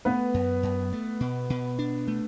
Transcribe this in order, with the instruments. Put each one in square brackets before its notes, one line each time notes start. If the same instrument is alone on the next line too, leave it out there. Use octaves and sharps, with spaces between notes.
[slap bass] A3 [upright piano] B3 B4
[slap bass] F#2
F#2
A3
B2
B2
D4
A3